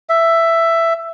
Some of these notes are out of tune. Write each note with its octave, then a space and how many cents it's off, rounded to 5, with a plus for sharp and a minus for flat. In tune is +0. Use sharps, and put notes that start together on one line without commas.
E5 +10